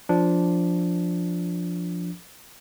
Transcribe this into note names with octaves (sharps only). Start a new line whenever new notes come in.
F3 D4